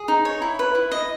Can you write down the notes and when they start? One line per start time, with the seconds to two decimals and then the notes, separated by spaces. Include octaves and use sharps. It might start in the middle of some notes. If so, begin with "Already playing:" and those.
Already playing: G#4 D#6
0.08 D#4
0.25 C#5
0.42 E4
0.59 B4
0.75 E4
0.92 D#5